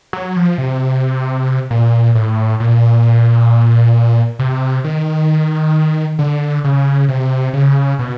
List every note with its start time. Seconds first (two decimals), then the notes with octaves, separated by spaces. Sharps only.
0.13 F#3
0.36 F3
0.58 C3
1.71 A#2
2.15 A2
2.60 A#2
4.39 C3
4.84 D#3
6.19 D3
6.64 C#3
7.09 C3
7.53 C#3
7.99 B2